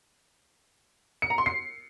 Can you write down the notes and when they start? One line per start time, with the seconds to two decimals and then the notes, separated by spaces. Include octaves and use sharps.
1.22 C#7
1.30 A#5
1.38 C6
1.46 C7